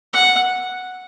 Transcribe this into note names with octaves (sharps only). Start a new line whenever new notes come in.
F#5